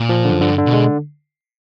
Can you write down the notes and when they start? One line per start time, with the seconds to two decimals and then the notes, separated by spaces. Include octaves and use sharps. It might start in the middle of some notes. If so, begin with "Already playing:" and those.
Already playing: A#2
0.09 F3
0.25 D3
0.30 F#2
0.41 G2 D3
0.58 D3
0.66 B2
0.73 G#3